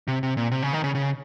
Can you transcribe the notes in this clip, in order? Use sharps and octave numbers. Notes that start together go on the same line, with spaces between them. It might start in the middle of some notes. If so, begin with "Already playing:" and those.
C3
C3
A#2
C3
C#3
D#3
C#3
C#3